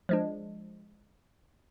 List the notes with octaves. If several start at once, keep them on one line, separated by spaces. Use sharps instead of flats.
F3 G#3 D4